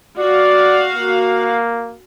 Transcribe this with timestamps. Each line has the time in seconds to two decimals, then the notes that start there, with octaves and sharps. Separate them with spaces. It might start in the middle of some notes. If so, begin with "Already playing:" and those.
0.19 F#4 D5 F5
0.96 A#3